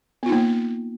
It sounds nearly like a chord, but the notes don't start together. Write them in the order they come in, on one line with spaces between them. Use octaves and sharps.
B3 F4 D#4 A#3